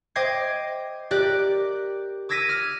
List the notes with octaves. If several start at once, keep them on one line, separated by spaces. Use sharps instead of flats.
C5 D#5 G5 D6 G#6 C7
G4 A#4 D5 D6 F#6
D6 E6 G#6 A#6 B6 D#7
F6 D#7